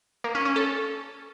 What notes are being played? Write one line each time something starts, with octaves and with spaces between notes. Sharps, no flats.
A#3
C#4
C#4
A4